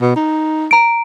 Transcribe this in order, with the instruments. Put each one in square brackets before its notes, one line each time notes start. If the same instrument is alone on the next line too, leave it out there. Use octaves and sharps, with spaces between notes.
[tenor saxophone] B2
D#4
[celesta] A#5 D7